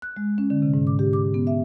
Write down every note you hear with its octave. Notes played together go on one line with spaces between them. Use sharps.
F#6
G#3
C#4
D3
C3
G#2
D6
G4
D6
B3
E5